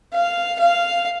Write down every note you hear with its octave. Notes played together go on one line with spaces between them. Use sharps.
F5
F5